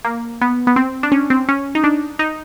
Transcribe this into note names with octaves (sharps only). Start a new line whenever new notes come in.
A#3
B3
B3
C4
D4
C#4
C4
C#4
D#4
D4
D#4